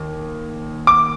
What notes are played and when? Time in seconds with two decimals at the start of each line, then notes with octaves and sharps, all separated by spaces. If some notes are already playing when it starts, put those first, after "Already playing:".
Already playing: D#2
0.87 D6